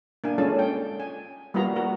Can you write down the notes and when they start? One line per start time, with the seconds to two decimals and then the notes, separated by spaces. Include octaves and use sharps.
0.24 A#3 D4 G#5
0.38 G#3 C#4 F4 A4 A5
0.59 G5
1.00 G#5
1.54 G3 A#3 B3 F4 F#4 A#5
1.76 F#4 A#4